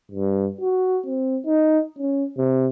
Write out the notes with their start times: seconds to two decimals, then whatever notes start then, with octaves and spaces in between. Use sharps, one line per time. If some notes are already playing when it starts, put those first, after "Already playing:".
0.11 G2
0.61 F#4
1.06 C4
1.46 D#4
1.98 C#4
2.37 C3